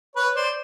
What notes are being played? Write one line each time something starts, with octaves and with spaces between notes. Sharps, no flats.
B4 C#5
C5 D5